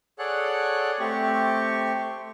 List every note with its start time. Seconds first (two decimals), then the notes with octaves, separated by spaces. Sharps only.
0.19 G#4 A4 C#5 D5 F#5 F#6
1.00 A3 C4 G4 C#6